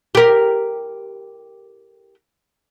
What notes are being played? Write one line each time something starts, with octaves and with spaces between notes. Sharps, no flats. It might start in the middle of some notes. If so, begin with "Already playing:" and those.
G4 A#4